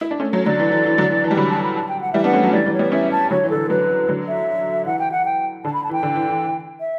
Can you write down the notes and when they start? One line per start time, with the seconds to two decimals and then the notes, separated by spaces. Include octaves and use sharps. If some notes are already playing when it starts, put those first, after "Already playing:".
0.01 E4
0.11 D4
0.20 A3 C#4 A4
0.33 F#3 A3 C#5
0.45 D3 F#3 D5
0.60 E3
0.72 E3
0.85 E3
0.98 D3 F#3
1.11 E3
1.24 E3
1.27 G3 A5
1.37 D3 F#3 B5
1.50 A5
1.63 B5
1.75 A5
1.89 G5
2.01 F#5
2.13 E3 G3 E5
2.24 B3 D4 F#5
2.33 A3 C#4
2.43 F#3 A3
2.53 E3 G3 D5
2.66 E3 G3
2.73 C#5
2.79 G3 B3
2.92 C#4 E4 E5
3.12 A5
3.30 D3 F#3 C#5
3.44 E3
3.50 D3 A4
3.57 E3
3.69 D3 F#3 B4
4.09 D3 F#3
4.28 E5
4.86 E3 F#5
4.99 G5
5.12 F#5
5.25 G5
5.64 D3 A5
5.73 B5
5.84 A5
5.90 E3
5.93 G5
6.03 D3
6.15 E3
6.29 E3
6.80 E5